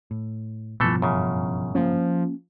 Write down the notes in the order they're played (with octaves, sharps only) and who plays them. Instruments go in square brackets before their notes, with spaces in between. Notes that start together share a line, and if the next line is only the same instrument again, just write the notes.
[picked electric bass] A2
[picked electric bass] A1 G2 [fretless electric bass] B2 F3 [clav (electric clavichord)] E3 A3 A4
[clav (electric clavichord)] F#2 C#3
[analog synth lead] F3 [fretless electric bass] A#3 C#4